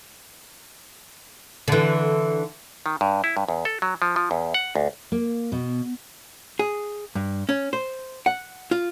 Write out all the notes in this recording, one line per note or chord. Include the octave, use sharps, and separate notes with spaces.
D3 E3
D#3
G2
E4
G2
E2
A4
F#3
F3
F3
E2
F#5
D2
A#3
B2
G#4
G2
C#4
C5
F#5
F4